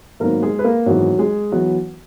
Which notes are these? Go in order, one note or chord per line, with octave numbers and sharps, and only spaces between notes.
G#1 G#2 F#3 A#3 B3 A#4
G#3 G#4
B4
A#3 A#4
G#1 F#2 E3 F#3 G#3 B3 F#4
G#3 G#4
E3 F#3 B3 F#4